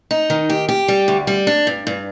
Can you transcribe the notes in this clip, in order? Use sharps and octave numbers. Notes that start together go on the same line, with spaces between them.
D#4
D#3
G4
G4
G3
D2
G3
D4
G2
G2